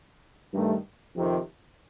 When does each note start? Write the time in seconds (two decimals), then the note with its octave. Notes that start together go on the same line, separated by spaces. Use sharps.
0.54 G2 D#3 A3
1.16 F2 C3 D#3